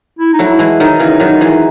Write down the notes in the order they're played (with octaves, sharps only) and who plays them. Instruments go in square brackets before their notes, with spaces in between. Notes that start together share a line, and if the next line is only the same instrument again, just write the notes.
[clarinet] E4
D#4
[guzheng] F#3 A3
[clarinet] E4
[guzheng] E3 G#3
[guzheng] D#3 F#3 [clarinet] D#4
[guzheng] C#3 E3
D#3 F#3
E3 G#3